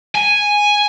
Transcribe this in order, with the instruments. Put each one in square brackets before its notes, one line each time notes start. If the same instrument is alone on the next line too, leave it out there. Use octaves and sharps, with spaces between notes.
[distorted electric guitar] G#5